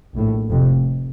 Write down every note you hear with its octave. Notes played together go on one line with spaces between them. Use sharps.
A#1 A2
F1 F2 C3